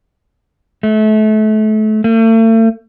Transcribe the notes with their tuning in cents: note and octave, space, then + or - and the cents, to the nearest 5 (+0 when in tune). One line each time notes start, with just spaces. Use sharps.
A3 -30
A3 +40